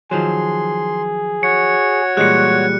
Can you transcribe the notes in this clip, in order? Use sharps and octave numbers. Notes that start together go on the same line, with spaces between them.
D#3 F3 F#3 G#4 C6
F#4 C#5 C#7
A#2 E3 G3 G#3 F#6 C#7